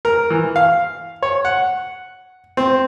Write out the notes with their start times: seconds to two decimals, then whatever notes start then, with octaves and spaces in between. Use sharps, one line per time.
0.05 A#4
0.30 E3
0.56 F5
1.23 C#5
1.45 F#5
2.57 C4